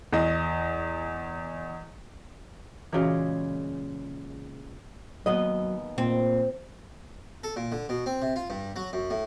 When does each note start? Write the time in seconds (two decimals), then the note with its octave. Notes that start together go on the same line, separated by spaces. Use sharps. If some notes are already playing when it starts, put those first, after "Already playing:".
0.13 E2 D#5
2.93 A#2 C#3 E3 G#3 F#4
5.26 D#2 F#3 B3 D#5
5.98 A#2 C4
7.44 A4
7.56 A#2
7.72 D3
7.89 B2
8.06 C4
8.22 C3
8.36 F4
8.50 G2
8.76 F#3
8.93 F#2
9.10 A2